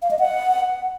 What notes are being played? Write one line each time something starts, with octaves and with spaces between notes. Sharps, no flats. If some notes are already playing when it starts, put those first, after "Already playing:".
F5
D#5
F#5